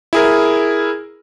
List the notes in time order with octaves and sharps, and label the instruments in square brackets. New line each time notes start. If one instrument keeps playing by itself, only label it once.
[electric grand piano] E4 G#4 A#4